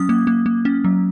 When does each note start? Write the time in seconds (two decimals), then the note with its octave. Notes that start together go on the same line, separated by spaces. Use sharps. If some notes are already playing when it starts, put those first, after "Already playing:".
Already playing: F#3 C#4 D#6
0.09 A#3
0.27 A#3
0.46 A#3
0.65 C#4
0.84 F#3